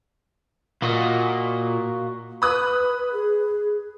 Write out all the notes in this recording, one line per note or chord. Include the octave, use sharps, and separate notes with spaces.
A#2 A#3 F#4 D#5
B4 B5 D#6 F#6
G#4